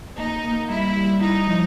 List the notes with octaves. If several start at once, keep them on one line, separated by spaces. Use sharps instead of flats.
A#3 D#4
A#3
G3 E4
G3
D#4 E4
F3